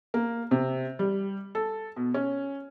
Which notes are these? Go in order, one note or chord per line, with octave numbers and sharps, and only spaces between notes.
A#3
C3
G3
A4
B2
C#4